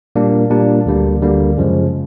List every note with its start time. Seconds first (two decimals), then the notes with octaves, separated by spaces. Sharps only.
0.16 A#2 G3 A#3 D4
0.50 A#2 G3 A#3 D4
0.86 D2 D3 G3 A#3
1.22 D2 D3 G3 A#3
1.58 F#2 C#3 F3 G#3